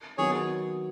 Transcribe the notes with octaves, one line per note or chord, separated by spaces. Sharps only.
D#3 F#3 B3 F#4 G#4 C#5